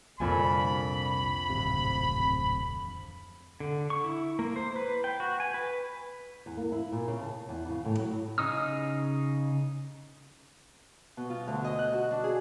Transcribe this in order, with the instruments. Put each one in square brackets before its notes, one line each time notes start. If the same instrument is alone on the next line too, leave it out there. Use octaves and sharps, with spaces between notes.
[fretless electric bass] C2 A#2 D3 [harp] F2 D4 G#5 [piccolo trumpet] B5
[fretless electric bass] D1 G#1 C3
[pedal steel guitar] D3
C#6
E4
A#3
C5
B4
G5
F#4
G#5
B4
[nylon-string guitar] E2
A#3
E4
A#2
C#3
A5
E2
C#3
A2
F#3
[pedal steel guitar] C#3 D#4 D#6 F6
[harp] B2
F4
D2
D#5
F#6
F#4
D4
G#4